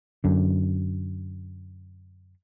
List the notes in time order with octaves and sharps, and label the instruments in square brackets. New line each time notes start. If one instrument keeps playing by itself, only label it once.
[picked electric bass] F#2 D3